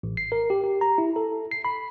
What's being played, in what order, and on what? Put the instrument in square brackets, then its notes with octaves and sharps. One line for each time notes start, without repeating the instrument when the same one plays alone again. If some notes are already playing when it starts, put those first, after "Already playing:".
[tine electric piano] A1
C7
A#4
G4
G4
A#5
E4
A4
C7
B5